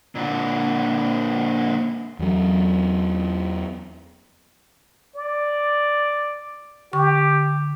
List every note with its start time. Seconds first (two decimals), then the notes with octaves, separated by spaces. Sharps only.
0.15 A#2 D3
2.19 E2 F#3
5.16 D5
6.93 D3 G4 C#6